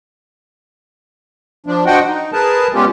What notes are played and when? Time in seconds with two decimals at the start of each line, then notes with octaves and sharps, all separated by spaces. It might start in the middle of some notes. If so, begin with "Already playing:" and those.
1.67 F3 D4
1.86 D4 F#4 C5 D#5 F#5 G5
2.08 D#4
2.33 G#4 A#4 B4 A5
2.74 G3 G#3 B3 C#4 F4 G4